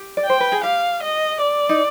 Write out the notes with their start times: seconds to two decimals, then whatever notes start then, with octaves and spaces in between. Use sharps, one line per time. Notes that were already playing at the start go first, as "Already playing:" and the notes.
Already playing: G4
0.17 D5
0.25 C5 G5
0.40 B4
0.52 G#4
0.63 G4 F5
1.03 D#5
1.42 D5
1.69 D#4